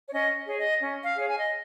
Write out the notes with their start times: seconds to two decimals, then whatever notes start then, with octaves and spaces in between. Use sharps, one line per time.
0.08 C#5
0.12 C#4 D#5
0.46 G#4 C#5
0.58 D#5
0.82 C#4
1.03 F5
1.16 G#4 C#5
1.27 G#5
1.39 D#5